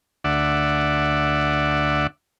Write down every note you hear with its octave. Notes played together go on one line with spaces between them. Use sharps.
D2 D5 E5 F#5